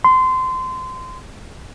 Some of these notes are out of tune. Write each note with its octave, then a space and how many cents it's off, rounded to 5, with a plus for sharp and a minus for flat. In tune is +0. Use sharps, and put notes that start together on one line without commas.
C6 -25